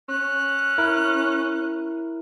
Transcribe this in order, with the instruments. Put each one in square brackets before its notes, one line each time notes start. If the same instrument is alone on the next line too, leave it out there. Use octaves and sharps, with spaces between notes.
[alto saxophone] C#4 [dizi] F#6
[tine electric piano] E4 A#4